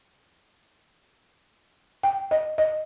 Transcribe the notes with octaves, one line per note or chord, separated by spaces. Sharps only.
G5
D#5
D#5